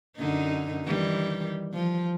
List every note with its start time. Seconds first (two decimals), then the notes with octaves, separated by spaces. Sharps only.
0.17 F#2 D3 D#4
0.85 D#3 E3 G3
1.74 F3